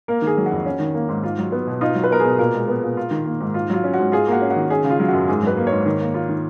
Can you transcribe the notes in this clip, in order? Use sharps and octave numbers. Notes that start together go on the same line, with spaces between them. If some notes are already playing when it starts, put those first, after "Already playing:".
A#3 A#4
D#3
G#4
F#3
F#4
F2
C#4
D#3
A#3
G#2
F4
F#3
B3
B2
D#4 F4
F#3
B4
B3 A#4
G#4
B2
A#2 A#4
G#3
B3
A#2
F4
D#3
A#3
G#2
F4
F#3 F4
C#4
F#4
G#2
F4 G#4
A#3 F#4
C#4
F#4
D#3
C#4 G#4
C#3
F4
F#3
F#2 F#4
G#2 G#4
F#3 B4
A#3
C#5
G#2
D#3
A#3
F4
D#3